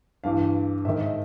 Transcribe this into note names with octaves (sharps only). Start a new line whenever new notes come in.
G2 E3 F5
G#2 D#3 E5
D#5